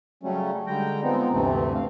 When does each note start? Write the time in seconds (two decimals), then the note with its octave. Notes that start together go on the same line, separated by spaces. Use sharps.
0.23 C#3 F#3 G3 A3 C#4
0.67 D3 G3 G#3 G5 A#5
1.03 F3 G#3 B3 C4 D#4
1.31 D2 G2 C3 E3 A3 C4
1.75 F5